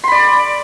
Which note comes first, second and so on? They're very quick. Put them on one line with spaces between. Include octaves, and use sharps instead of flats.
C6 B5 D5